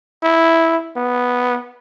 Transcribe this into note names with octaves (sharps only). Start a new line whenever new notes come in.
E4
B3